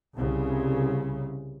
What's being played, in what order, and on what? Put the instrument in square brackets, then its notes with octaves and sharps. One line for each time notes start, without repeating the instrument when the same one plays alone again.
[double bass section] C2 C#3